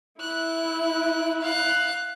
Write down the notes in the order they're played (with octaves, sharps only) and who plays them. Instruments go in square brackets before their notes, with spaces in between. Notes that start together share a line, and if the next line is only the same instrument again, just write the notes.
[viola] E4 [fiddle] F#6
[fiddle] F5 F#6